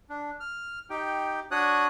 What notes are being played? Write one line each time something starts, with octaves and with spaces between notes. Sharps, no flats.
D4
F6
D#4 G4 G5
D4 F#4 C#5 D#6 F#6